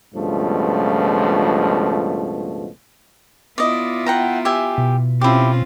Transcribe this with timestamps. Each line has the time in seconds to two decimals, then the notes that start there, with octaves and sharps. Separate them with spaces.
0.15 C#2 G2 B2 F3 A3
3.58 B3 E4 F4 D5 D#5
4.06 F#5 G5 A#5
4.45 G4 E5 G#5
4.78 B2
5.21 C4 C#4 E4 F4 G4